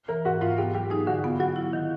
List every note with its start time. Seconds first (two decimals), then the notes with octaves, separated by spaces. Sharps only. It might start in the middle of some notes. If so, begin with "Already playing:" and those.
0.08 E3 A#4
0.25 G#2 F#4
0.41 G#2 F4
0.58 B3 G4
0.74 F#3 G4
0.90 D#4 G#4
1.07 D3 F#4
1.24 B3 F4
1.40 F#3 F#4
1.56 E4
1.73 D#3